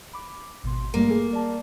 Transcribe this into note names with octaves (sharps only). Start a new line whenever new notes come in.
B5 D6
G#1 B2 C6
G2 G3 A3 A#3
G#4 A4
D5 A5